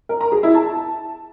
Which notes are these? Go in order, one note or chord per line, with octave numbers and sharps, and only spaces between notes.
A#4
A#5
G#4
E4
A5